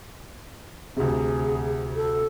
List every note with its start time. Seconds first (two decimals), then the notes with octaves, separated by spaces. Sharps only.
0.97 D2 C3 G#4
1.96 A4